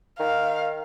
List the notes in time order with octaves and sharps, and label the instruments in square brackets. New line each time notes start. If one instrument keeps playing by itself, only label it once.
[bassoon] D#3 [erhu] F5